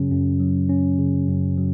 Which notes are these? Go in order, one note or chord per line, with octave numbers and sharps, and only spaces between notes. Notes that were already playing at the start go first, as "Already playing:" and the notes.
Already playing: F#2 C#3 F#3 C#4
F#2
F#3
C#4
C#3
F#2
F#3